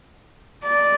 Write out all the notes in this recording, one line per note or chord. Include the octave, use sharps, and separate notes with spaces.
D5